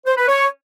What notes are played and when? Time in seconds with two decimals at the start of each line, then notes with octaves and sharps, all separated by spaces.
0.06 C5
0.17 B4
0.28 C#5